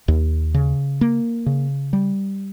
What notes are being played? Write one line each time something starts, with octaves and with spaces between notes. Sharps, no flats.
D#2
C#3
A#3
C#3
G3